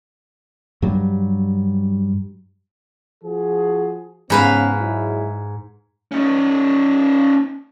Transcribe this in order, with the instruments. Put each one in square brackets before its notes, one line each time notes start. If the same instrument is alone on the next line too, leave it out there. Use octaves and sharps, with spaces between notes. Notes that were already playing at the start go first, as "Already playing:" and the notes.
[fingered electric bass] G2 F#3 G3
[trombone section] F3 F#4 G#4
[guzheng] G#2 B4 F5 [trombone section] C#3 B3
[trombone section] F#3 G#3 E4
[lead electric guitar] C#4 D#4